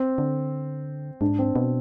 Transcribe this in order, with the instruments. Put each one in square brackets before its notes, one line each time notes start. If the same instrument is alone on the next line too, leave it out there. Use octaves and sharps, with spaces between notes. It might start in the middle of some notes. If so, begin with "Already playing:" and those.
Already playing: [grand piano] C4
[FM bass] D3
[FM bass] G#2 [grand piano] D4
[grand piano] C4
[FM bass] B2